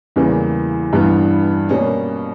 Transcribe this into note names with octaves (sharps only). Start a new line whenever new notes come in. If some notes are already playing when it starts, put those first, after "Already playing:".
E2 C#3 E3 G3 A#3
G2 E3 G3 B3
B2 G3 A#3 C#4